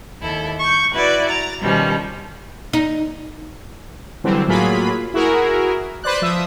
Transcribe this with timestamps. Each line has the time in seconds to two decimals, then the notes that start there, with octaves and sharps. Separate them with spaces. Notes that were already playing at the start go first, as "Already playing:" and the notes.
0.21 D#2 E4 A4
0.59 C#6 G6
0.93 E4 F#4 B4 D5
1.28 A#5 A6
1.61 B2 D#3 F3 G3 C#4
2.73 D#4
4.24 D3 E3 F#3 G3 C4
4.48 A2 F#3 A#3 F4 G#4 B5
5.14 E4 F#4 G#4 A#4
6.03 B4 C5 D5 F#6
6.22 F3 E5 D#6